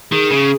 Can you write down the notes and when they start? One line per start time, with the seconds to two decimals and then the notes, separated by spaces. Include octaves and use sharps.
0.12 D#3 G#4
0.31 C#3